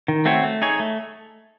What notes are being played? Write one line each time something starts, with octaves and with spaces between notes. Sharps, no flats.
D#3
A3 C4 F#4 C#5
A3
D#4 G#4 C#5
A3